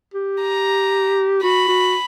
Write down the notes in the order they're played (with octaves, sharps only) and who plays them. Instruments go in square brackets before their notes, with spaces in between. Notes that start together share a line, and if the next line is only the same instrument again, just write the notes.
[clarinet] G4
[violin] A#5
[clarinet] F#4 [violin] B5
[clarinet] F#4